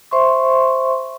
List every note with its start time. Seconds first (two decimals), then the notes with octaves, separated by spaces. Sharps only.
0.11 C5 E5 C6 C#6